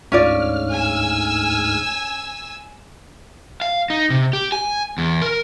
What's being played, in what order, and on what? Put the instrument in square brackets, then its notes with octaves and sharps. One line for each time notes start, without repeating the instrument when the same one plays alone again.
[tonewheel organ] D2 G#2 F6 [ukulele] C#4 F4 D5
[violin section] G#5 E6
[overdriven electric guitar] F5
D#4
C3
G4
G#5
E2
A#4